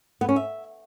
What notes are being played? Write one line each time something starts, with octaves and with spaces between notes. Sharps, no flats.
B3
C#4
E5